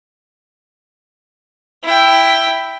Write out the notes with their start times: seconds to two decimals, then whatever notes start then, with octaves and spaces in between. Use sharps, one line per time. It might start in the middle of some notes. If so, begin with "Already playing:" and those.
1.84 E4 G5